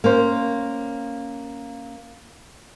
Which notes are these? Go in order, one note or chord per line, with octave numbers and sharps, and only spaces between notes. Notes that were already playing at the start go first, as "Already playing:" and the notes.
A#3 C#4 C5